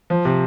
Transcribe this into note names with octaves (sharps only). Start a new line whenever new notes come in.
F3
C3